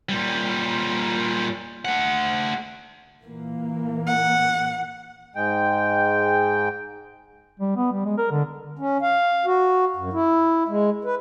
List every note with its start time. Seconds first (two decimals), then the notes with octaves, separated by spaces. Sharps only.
0.09 A#2 G3
1.85 A3 F#5
3.23 A#2 E3 A#3
4.07 F#5
5.35 G#2 G#3 G5
7.60 G3
7.76 B3
7.92 G3
8.05 G#3
8.18 A#4
8.31 D3
8.79 C#4
9.02 F5
9.46 F#4
9.96 F#2
10.13 E4
10.68 G#3
11.05 B4